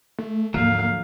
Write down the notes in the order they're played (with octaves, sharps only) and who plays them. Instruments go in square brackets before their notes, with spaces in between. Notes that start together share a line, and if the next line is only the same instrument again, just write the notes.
[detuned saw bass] A3
[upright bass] G#1 D#2 [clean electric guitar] D3 F3 F#3 [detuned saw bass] A#3 [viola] F5